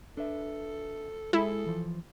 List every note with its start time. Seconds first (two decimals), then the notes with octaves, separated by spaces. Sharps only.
0.17 D4 A4 B4 E5
1.33 G#3 E4 G#4 A4
1.66 E3 F3